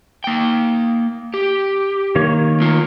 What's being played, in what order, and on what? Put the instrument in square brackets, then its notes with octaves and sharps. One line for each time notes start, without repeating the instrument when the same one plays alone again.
[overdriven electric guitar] A#3 G5
G4
[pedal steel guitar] D#3 A#3 C#5
[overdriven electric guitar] A3 F4